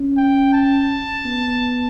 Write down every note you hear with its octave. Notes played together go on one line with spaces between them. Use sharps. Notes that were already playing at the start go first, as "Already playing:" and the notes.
Already playing: C#4
G5
A5
B3